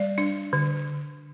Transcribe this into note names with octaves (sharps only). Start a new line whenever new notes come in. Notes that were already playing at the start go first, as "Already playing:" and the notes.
Already playing: G3 D5
D4
D3